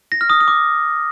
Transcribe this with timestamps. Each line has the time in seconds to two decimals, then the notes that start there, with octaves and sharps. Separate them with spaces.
0.12 A#6
0.21 F6
0.30 D#6
0.40 D#6
0.48 D6